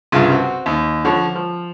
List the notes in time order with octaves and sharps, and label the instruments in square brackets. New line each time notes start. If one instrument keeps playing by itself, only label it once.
[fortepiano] C2 G2 C#3 F4
C4 F#4
D#2
D3 F3 C#5
F3